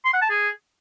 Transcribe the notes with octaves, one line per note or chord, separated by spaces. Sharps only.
C6
F#5
A5
G#4